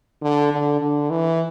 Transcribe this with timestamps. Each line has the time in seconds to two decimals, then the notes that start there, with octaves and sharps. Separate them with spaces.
0.23 D3
0.52 D3
0.81 D3
1.11 E3